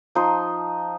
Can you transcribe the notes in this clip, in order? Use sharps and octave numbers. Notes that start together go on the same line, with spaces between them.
F3 D#4 C6